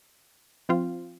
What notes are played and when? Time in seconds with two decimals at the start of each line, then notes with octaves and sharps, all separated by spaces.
0.69 F3 C4 F4